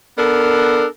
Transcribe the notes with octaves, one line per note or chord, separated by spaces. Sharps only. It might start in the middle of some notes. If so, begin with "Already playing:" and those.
B3 D4 A4 A#4